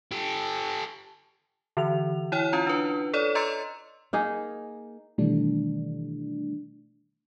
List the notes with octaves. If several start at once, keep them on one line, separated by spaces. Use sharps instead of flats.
G4 A4
D3 E3 F7
E4 C#5 G5 F6
C#4 F4 A#5
D4 B4
A4 C#5 D5
D#5 A#5 C6 E6 A6 C#7
A#3 D#4 G#4
B2 D#3 E3 G3 A3 D4